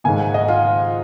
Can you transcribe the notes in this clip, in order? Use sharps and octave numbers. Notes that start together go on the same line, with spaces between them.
G#2 D#3 A#3 G#5
F#5
D#5
F4